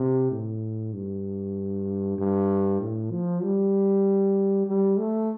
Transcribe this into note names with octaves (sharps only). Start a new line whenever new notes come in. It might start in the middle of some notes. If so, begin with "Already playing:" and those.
Already playing: C3
A2
G2
G2
A2
F3
G3
G3
A3